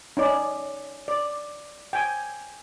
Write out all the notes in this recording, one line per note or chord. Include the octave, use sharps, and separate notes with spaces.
C#4 D#4 D5
D5
G5 G#5